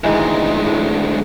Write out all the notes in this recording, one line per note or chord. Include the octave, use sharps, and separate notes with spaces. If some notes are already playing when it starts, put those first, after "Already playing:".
D2 G#2 D#3 E3 G#3
A2